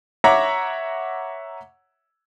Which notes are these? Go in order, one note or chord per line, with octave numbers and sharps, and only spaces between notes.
C#5 E5 F#5 A#5 D6